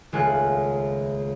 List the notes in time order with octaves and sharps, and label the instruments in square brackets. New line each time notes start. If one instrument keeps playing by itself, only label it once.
[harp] D#1 C#2 A3 F4 G#5 F#6